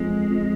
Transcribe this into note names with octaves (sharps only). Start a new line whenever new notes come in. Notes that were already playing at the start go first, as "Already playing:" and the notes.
Already playing: F2 G#3
F2